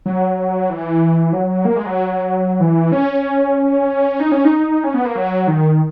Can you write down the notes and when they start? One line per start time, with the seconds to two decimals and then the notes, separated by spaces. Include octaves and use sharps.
0.06 F#3
0.70 E3
1.33 F#3
1.65 A#3
1.76 G#3
1.86 F#3
2.60 E3
2.92 C#4
4.20 D#4
4.32 C#4
4.45 D#4
4.84 C#4
4.94 B3
5.05 A#3
5.15 F#3
5.47 D#3